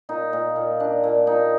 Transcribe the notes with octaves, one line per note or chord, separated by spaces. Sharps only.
A#2 D#4
A#2
A#2
A#2 D4
A#2
A#2 D#4